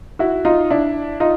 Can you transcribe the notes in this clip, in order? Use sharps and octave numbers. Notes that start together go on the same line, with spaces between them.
E4 F#4
D#4 F4
D4 E4
D#4 F4